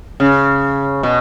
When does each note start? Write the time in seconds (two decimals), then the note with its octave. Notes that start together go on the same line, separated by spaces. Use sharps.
0.20 C#3
1.03 B2